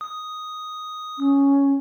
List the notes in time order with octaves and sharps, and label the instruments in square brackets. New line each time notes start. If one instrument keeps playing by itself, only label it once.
[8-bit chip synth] D#6
[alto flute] C#4